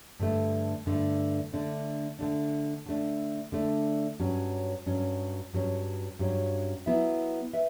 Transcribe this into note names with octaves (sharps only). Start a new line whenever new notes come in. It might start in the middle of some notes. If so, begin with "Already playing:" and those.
G2 D3 A3
G2 D3 A3
D3 A3 D4
D3 A3 D4
D3 A3 D4
D3 A3 D4
G2 F#3 C#4
G2 F#3 C#4
G2 F#3 C#4
G2 F#3 C#4
F#3 B3 E4 B4 E5
B4 E5